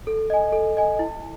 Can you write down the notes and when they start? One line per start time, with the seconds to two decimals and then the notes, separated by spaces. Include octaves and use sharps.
0.07 A4
0.30 D#5 G#5
0.53 A4
0.77 D#5 G#5
0.99 E4